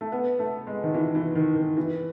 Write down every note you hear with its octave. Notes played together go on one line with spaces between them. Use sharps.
A3
B3
A3
G#3
D#3
E3
E3
D#3
D#3
E3